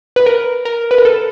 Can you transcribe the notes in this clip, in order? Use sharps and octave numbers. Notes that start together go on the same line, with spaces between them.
B4
A#4
A#4
B4
A#4
A4